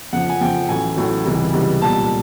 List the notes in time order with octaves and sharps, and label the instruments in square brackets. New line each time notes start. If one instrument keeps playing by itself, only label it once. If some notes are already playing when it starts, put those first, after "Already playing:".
[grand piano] F2 C#3 F3 F#5
G#5
F2 C#3 F3 G5
A1 A2 F#3 G#5
A1 A2 F#3
C#2 C3 E3 G3
C#2 C3 E3 G3
B1 A#2 G3 A5